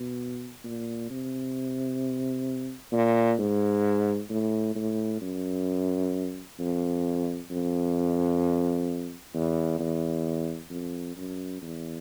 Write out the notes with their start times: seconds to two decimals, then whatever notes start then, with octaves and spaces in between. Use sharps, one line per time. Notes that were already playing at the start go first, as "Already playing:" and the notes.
Already playing: B2
0.64 A#2
1.10 C3
2.93 A#2
3.39 G#2
4.30 A2
4.76 A2
5.21 F#2
6.60 F2
7.51 F2
9.34 E2
9.79 E2
10.70 F2
11.17 F#2
11.62 E2